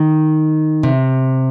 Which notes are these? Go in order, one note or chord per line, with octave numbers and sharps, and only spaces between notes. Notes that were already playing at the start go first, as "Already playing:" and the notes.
Already playing: D#3
C3